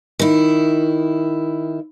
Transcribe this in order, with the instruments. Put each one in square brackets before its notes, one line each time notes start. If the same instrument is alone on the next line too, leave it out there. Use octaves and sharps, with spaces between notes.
[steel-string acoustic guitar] D#3 E4